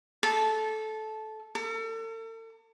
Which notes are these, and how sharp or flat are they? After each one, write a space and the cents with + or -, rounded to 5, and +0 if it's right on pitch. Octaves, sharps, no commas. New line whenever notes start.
A4 -15
A4 +40